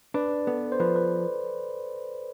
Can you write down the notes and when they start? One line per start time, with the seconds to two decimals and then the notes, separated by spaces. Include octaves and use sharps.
0.14 D4 B4 D5
0.47 B3 A4
0.72 C5
0.80 F3 B4
0.96 B4